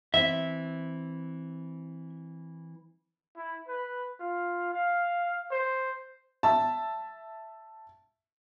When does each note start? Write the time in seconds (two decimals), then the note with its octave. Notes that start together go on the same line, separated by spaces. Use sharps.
0.14 E3 C4 E5
3.37 E4
3.68 B4
4.20 F4
4.74 F5
5.51 C5
6.43 E5 A5